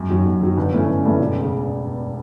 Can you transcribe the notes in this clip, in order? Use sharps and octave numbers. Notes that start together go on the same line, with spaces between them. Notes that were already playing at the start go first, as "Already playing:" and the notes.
Already playing: F#2
D#3 F#3
F#2
D#3 F#3
G1
G2 E3 A3 C#4
G1
G2 E3 A3 C#4
E1
C#3